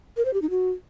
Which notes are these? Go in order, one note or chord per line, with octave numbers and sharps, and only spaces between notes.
A#4
C5
G4
D#4
F#4